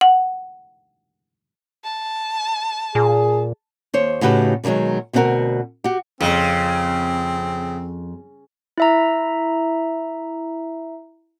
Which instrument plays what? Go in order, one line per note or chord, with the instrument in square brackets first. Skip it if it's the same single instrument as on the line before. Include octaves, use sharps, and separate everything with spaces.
[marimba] F#5
[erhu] A5
[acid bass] A#2 [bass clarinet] G#4
[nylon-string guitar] D#2 C5 C#5
A2 C#3 D#4 F#4 G4 B4
B2 D3 D#3 F#3 G#3
D2 B2 C4 D4 F#4 A#4
F#4 G4
[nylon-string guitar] F2 [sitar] C#3 [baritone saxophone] C4
[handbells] E4 E5 A#5